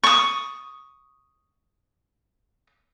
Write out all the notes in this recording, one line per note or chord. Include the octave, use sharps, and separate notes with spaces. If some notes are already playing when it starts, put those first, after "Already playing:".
C#6 D#6